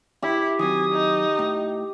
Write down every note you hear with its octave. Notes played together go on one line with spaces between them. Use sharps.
E4 G4
D#3 F#3 C4 G#5 D#6
D#4
A2